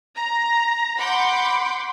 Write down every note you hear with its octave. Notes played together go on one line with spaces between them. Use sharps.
A#5
F#5 B5 C6 D6 G6